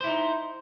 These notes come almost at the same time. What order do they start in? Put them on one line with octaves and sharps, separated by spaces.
C5 E4 D#4